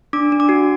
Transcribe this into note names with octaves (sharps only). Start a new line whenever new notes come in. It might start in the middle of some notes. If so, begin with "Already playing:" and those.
D4 D6
D4
D6
F#4